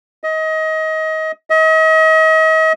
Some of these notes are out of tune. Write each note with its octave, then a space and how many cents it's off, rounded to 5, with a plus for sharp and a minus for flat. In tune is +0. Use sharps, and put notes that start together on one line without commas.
D#5 +25
D#5 +40